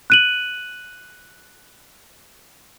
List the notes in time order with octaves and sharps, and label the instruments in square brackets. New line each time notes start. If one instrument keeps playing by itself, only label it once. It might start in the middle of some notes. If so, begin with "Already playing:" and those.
[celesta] F#6 D#7 F#7